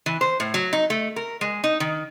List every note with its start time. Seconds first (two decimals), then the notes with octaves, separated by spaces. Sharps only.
0.06 E3
0.21 C5
0.40 A2
0.54 F#3
0.73 D#4
0.90 A3
1.16 A#4
1.41 G#3
1.64 D#4
1.80 D#3